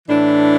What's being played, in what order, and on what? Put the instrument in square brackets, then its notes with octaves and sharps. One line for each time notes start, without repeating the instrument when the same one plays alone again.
[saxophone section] A2 E3 D4